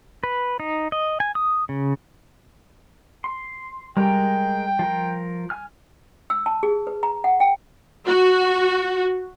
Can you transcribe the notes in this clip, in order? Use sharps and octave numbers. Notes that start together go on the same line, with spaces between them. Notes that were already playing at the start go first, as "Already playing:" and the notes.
B4
D#4
D#5
G#5
D#6
C#3
C6
G3 G#3 A#4 G5 A#5
F3 A#4
G#5 F6
E6
A5
G#4
B4
A#5
F#5
G5
F#4